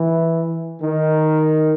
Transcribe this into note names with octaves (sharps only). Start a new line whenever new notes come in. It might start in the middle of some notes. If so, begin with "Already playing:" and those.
Already playing: E3
D#3